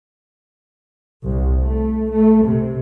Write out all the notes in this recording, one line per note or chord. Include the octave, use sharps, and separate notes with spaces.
C2
A3
A3
C3